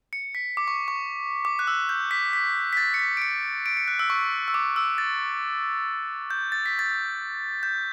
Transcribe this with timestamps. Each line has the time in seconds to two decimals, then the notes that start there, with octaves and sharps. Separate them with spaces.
0.13 C#7
0.35 B6
0.57 D6
0.68 C#6
0.88 C#6
1.45 D6
1.59 F#6
1.67 E6
1.89 G6
2.11 B6
2.33 B6
2.73 B6
2.77 A6
2.94 C#7
2.99 B6
3.17 D7
3.22 C#7
3.66 D7
3.77 C#7
3.88 F#6
3.99 E6
4.10 C#6
4.48 E6
4.54 D6
4.76 E6
4.98 A6
6.30 G6
6.52 A6
6.66 B6
6.79 A6
7.63 G6